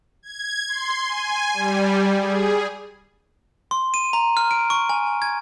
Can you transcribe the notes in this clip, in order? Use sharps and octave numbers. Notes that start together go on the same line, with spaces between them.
G#6
C6
G#5
G3
G#4
C6
D#7
A#5
F6
D7
C#6
G#5
G#6